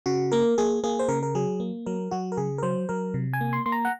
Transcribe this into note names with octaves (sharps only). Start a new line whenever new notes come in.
C#3 F#4
A#3 A#4
A#3 G#4
A#3 G#4
C5
C#3 A#4
A#4
F#3 G#4
A#3
F#3 A#4
F#3 F#4
A#4
C#3 G#4
A#4
F#3 C5
F#3 A#4
C3
G#5
A#3
C6
A#3 C6
A#5
F#5